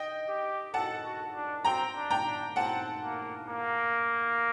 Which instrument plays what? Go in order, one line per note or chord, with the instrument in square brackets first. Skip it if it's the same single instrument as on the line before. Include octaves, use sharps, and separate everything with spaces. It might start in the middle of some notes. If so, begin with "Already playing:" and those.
Already playing: [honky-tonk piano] D#5 G5
[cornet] G4
[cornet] A4 [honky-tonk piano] F#5 A5
[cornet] F#4
D4
[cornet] C4 [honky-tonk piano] G5 A#5
[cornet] D4
[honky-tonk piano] G5 A#5
[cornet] D4
[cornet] C4 [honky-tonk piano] F#5 A5
[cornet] A#3
A#3